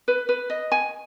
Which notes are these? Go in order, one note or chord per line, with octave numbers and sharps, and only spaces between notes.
B4
B4
D#5
G#5